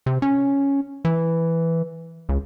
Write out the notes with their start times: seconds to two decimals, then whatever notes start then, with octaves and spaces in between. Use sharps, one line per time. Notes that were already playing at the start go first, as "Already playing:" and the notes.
0.06 C3
0.22 C#4
1.05 E3
2.29 C#2